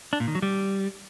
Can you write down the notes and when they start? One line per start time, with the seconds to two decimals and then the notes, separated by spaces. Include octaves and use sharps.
0.13 D4
0.20 A#2
0.28 D#3
0.35 F#3
0.42 G3